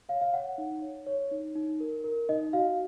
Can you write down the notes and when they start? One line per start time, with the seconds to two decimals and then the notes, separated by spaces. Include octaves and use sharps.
0.09 C#5 F5
0.21 F5
0.33 C#5 F#5
0.58 D#4
0.82 C#5
1.06 C#5
1.31 D#4
1.55 D#4
1.80 A#4
2.04 A#4
2.29 D#4 D#5
2.53 F#4 F5